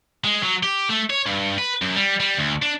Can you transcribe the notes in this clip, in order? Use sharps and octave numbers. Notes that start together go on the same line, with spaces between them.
G#3
F#3
G4
A3
C#5
G2
B4
F#2
G3
G3
D2
D4